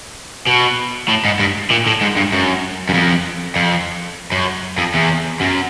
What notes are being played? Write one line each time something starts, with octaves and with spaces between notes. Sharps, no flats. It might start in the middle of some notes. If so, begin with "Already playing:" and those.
B2
A2
G#2
G2
A#2
A2
G#2
G2
F#2
F#2
F2
F2
F#2
F2
E2
F#2